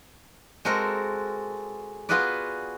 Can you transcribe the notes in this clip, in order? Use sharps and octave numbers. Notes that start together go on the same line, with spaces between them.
G#3 C4 F#4 A4 A#4
B3 F4 F#4 G#4 B4 D5